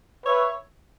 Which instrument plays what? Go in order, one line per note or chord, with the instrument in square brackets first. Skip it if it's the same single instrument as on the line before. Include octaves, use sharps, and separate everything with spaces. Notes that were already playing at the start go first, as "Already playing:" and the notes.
[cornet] B4 [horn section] C#5 E5